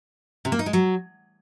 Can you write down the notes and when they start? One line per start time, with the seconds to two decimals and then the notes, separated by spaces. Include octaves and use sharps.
0.45 C3
0.52 A#3
0.59 D#4
0.66 G#3
0.73 F#3